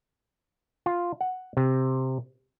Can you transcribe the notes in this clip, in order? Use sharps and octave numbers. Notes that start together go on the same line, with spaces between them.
F4
F#5
C3